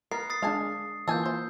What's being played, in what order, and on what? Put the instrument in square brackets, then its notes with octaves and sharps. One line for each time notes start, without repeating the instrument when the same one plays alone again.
[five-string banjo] B3 [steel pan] A#4 [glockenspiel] C7
[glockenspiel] D#6 A6 C7
[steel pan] G#3 D4 [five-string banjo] F5 G#5 A5
[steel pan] E3 A#3 F4 [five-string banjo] G#5 A5 [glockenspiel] E6 G6
[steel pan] E4 [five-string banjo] C5